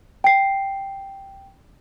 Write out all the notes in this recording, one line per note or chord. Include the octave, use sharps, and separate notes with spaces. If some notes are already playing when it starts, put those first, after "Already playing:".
G5 C7